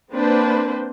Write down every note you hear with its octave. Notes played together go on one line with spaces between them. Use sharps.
A#3 C4 D4 B4 C5